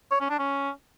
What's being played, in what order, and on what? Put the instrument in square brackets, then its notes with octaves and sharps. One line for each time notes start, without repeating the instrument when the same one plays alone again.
[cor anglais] C#5
C#4
D4
C#4